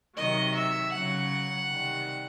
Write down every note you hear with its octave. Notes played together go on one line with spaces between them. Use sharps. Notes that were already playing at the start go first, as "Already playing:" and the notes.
C3 D#3 F#3 D#5
E5
C#3 F#3 F#5
C3 D#3 G3